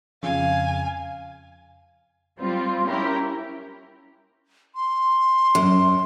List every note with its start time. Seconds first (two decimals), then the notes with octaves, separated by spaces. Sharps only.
0.23 F2 C#3 F5 G#5
2.40 G3 C4 F4
2.87 C#4 E4 G4 A#4
4.75 C6
5.55 F#2